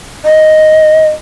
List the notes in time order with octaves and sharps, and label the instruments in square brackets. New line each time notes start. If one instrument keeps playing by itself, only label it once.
[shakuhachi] D#5